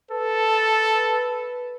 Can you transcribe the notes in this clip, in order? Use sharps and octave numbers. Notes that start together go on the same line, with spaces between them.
A4 B4